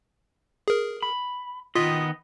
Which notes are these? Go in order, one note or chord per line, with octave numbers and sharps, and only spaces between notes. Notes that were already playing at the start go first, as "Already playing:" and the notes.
G#4 A#4
B5
D#3 B3 F4 D#5 B6